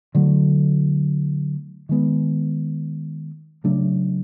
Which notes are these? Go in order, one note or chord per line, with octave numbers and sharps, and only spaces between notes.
D3 F#3 A3
D#3 G#3 B3
C#3 F#3 A3 D4